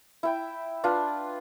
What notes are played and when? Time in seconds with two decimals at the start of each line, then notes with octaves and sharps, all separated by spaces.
0.23 E4 G5
0.84 D4 F4 B4